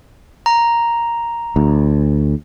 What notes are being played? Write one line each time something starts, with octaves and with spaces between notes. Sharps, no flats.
A#5
D2